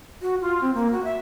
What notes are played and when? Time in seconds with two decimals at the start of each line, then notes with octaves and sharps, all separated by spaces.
0.22 F#4
0.41 F4
0.61 C4
0.74 A#3
0.92 F#4
1.04 E5